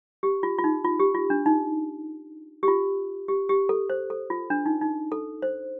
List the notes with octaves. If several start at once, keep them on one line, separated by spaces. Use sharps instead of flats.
G4
F4
F4
D#4
F4
G4
F4
D4
D#4
G4
F4
G4
G4
A4
C5
A4
F4
D4
D#4
D#4
A4
C5